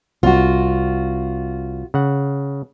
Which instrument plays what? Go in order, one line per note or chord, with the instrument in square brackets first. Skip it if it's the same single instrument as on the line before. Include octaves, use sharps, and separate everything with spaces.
[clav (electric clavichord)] C2 [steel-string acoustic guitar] F4 F#4
[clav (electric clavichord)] C#3 F#5